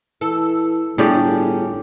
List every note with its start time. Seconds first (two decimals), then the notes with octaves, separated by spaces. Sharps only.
0.21 E3 A4
0.98 G1 A2 C#4 D4 G4 G#4 D5